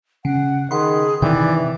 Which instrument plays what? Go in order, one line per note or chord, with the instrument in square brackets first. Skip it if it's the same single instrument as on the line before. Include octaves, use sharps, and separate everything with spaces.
[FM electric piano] C#3 [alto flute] F#5
[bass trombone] D#3 [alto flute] G#4 [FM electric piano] F#5 B5 C6
[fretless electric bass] C3 D#3 [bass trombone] E3 [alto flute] D5 [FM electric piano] G5